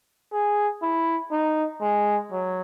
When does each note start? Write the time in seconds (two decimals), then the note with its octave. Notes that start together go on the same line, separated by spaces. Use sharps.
0.33 G#4
0.83 E4
1.31 D#4
1.81 G#3
2.32 F#3